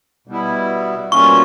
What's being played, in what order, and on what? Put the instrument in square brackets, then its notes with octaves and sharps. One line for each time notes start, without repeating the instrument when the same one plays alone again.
[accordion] B2 G3 B3 E4
[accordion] B2 G3 A#3 C#4 F4 [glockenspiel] C#6